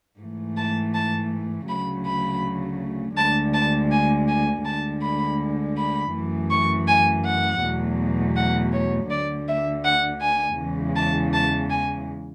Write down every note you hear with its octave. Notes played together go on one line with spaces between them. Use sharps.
G#2 E3 A3
A5
A5
D2 C#3 F#3 A3 B5
B5
D2 D3 G#3 A5
A5
G#5
G#5
D2 D3 G#3 A5
B5
B5
F#2 E3 A3
C#6
G#5
F#5
E2 B2 F#3 A3
F#5
C#5
D2 D3 A3 D5
E5
F#5
G#5
E2 C#3 E3 G#3
A5
A5
G#5